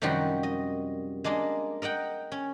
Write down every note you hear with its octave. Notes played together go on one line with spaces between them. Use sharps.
F#2 C3 D#3 F3 G3 F#4
D#5
G#3 A#3 D4 D#5
A#4 D#5 F#5 G5
C#4